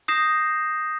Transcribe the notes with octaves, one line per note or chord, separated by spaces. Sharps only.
D#6 G6 A#6 C7 E7